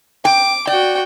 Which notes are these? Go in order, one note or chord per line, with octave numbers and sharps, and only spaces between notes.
G5 D6
F#4 D5 G5